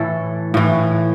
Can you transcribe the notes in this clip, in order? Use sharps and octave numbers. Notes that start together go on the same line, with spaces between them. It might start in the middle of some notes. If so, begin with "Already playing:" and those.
Already playing: A2 E3 A4
A2 E3